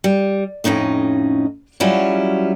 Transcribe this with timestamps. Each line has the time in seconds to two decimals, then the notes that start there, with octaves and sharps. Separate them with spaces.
0.04 G3
0.64 F2 A2 C#4 D#4 D#5
1.80 F#3 G3 C#4 E4 F4